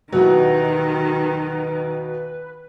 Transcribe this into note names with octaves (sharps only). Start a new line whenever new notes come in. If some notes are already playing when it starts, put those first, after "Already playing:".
D#2 B2 D#3 E3 F#3 F#4 B4